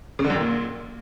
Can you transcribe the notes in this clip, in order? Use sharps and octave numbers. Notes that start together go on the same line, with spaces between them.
C#3
D3
F#2
D#3
A#2